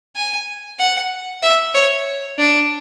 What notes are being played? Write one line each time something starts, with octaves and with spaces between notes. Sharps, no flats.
G#5
F#5
E5
C#5
D4